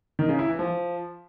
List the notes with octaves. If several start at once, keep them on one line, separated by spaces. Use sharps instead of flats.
D#3
C#3
E4
E3
F3